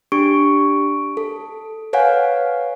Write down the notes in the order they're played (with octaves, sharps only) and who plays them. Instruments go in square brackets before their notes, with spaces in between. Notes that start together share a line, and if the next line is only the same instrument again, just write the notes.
[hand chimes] D4 G4 C#6 D7
A4
B4 C#5 F5 F#5 G#5